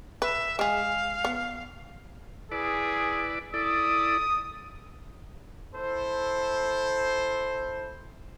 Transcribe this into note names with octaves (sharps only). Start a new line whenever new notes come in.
B4 E5
G#3 G#4 F5
B3
E4 G#4 B4 D5
E4 A4 D5 D#6
E4 A4 C5